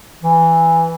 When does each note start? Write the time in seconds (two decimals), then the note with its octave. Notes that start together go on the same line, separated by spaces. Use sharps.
0.22 E3